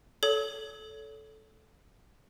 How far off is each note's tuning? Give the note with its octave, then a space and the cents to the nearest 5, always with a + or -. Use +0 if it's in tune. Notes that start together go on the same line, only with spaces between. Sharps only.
A4 -10 C#5 +35 D#6 +0